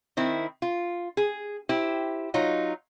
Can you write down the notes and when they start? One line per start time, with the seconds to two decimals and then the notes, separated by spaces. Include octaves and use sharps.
0.17 D#3 C4 E4
0.62 F4
1.17 G#4
1.69 E4 G4 C5
2.34 F#3 D#4 F4